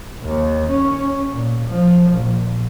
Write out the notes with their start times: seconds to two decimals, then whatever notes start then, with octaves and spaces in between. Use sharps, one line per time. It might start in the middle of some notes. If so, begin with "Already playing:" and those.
0.23 D#2
0.70 C#4
1.32 A#2
1.68 F3
2.11 A#1